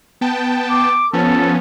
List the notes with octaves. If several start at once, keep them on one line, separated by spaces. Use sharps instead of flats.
B3 G5 A5
D6
F3 B3 C#4 A4